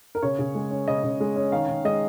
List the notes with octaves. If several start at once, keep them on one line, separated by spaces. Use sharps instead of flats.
A#4
C#3 C#5
C#3
G#3
C#4
C#3 D#5
C#3
G#3
C#4
D#3 F5
D#3
G#3 D#5